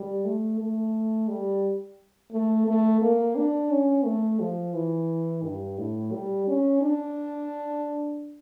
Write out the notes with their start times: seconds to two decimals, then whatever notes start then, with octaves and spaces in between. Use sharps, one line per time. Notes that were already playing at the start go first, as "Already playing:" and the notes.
Already playing: G3
0.25 A3
0.59 A3
1.28 G3
2.32 A3
2.67 A3
3.01 A#3
3.36 D4
3.70 C#4
4.05 A3
4.40 F3
4.74 E3
5.43 G2
5.78 A2
6.12 G3
6.47 C#4
6.82 D4